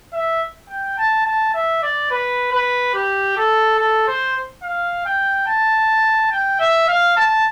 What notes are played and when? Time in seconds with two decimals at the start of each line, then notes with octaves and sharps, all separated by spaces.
0.13 E5
0.69 G5
0.98 A5
1.26 A5
1.54 E5
1.83 D5
2.10 B4
2.52 B4
2.94 G4
3.37 A4
3.79 A4
4.07 C5
4.63 F5
5.05 G5
5.47 A5
6.31 G5
6.60 E5
6.88 F5
7.17 A5